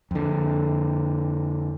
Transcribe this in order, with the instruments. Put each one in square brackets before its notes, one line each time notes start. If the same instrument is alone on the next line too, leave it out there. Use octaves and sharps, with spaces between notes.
[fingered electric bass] F2 D3